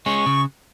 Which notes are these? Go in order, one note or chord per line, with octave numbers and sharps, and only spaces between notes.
G#3 C#4 C#6
C#3